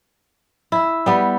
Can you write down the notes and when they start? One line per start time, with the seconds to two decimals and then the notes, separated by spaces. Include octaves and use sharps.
0.72 E4
1.06 G3 B3